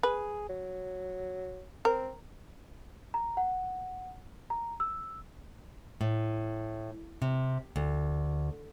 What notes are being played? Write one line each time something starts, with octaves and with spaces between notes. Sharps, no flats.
G#4 B4
F#3
C4 A#4
A#5
F#5
A#5
E6
A2
C3
D2